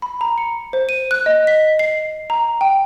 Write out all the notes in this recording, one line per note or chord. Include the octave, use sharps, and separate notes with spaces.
B5
A#5
C#7
C5
D#7
F#6
D#5
B6
C7
A#5
G5